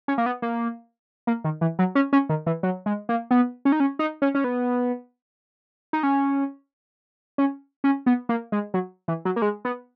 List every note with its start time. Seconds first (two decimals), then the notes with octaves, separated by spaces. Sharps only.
0.08 C#4
0.18 A#3
0.26 B3
0.42 A#3
1.27 A#3
1.44 D#3
1.61 E3
1.79 F#3
1.95 C#4
2.13 C#4
2.29 D#3
2.46 E3
2.63 F#3
2.86 G#3
3.09 A#3
3.31 B3
3.65 C#4
3.72 D#4
3.80 C#4
3.99 D#4
4.22 C#4
4.35 C#4
4.44 B3
5.93 D#4
6.03 C#4
7.38 C#4
7.84 C#4
8.06 B3
8.29 A#3
8.52 G#3
8.74 F#3
9.08 E3
9.25 F#3
9.36 A#3
9.42 G#3
9.65 B3